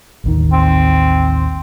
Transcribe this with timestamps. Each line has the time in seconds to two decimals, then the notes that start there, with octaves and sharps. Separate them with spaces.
0.24 A1 D#2 D#3
0.52 C4